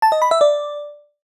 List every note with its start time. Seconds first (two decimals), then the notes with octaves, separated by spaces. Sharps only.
0.02 A5
0.12 D#5
0.22 B5
0.31 E5
0.41 D5